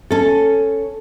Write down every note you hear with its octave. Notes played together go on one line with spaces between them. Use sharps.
C#4 A4